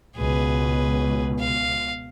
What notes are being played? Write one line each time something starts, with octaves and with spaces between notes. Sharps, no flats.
C#2 B2 G#4 B4
F5